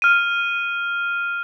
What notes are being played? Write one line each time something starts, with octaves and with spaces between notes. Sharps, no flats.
F6 D#7